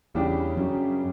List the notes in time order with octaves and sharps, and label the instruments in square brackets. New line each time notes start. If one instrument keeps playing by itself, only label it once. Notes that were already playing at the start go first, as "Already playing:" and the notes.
[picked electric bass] E2 [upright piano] C#3 G3 D4 G4
[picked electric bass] F#2